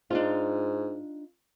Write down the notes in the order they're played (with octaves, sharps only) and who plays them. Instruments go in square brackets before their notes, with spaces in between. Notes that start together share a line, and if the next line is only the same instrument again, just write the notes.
[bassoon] G#2 [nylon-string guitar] D4 D#4 F4